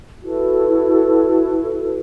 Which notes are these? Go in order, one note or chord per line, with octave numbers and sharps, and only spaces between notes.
E4 F#4 A4 B4